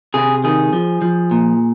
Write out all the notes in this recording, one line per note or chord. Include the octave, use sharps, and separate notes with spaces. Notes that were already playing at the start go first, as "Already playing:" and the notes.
C3 G#4
D#3 G#4
F3
F3
A#2